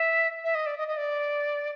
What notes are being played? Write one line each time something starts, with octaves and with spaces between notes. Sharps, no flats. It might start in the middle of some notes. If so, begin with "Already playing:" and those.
Already playing: E5
E5
D#5
D5
D#5
D#5
D5